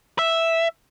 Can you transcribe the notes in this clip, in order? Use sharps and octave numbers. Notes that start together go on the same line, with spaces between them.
E5